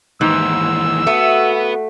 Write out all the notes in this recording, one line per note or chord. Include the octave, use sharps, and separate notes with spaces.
D#2 G#2 E3 E6
A3 B3 F#4